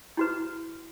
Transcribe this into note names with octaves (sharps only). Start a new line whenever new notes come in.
E4 F#4 B4